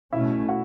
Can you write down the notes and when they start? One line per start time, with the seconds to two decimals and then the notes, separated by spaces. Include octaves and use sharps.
0.13 B2 A3 C#4 E4 E5
0.49 F#4 F#5